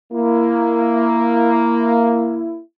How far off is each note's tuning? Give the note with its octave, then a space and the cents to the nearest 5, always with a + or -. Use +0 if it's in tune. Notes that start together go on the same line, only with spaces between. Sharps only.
A#3 +0 E4 +15